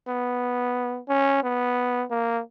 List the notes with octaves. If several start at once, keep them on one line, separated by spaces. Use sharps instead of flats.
B3
C#4
B3
A#3